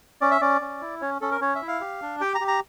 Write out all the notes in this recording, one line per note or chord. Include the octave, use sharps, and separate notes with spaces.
C#4 D5
E5
C#4 D5
C#4
E4
C#4 C#5
C#4 A4
A#4
C#4 C#5
E5
E4
F5
G4
D4
G4 G5
A#5
G4
A#5